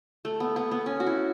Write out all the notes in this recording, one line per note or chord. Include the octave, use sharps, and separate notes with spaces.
A3
B3
B3
B3
C#4
F#4
E4